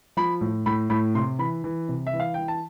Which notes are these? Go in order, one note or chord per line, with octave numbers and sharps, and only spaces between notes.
F3 B5
A2
A2 B5
A2 B5
C3 C6
E3 B5
E3
C3
E5
E3
F5
E3 G5
A5